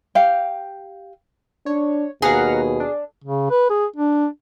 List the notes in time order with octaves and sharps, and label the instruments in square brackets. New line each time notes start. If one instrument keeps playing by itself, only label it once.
[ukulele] G4 F5 G5
[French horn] D4 [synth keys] C#5
[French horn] D#2 [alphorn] B2 [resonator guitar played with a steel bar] G#4 [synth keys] F5 F#5 A#5
[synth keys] D4
[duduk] C#3
B4
G#4
D4